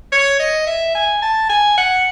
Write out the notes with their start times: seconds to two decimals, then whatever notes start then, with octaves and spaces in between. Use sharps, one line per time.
0.12 C#5
0.39 D#5
0.67 E5
0.95 G#5
1.22 A5
1.50 G#5
1.77 F#5